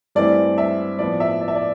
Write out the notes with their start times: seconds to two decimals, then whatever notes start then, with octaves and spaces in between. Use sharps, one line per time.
0.15 G2 E3 A3 C4 D5
0.58 E5
0.99 A2 F3 B3 D5
1.20 E5
1.41 D5
1.48 E5
1.55 D5